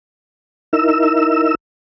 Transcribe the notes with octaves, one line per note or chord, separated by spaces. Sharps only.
D#4 E4 A#4 E6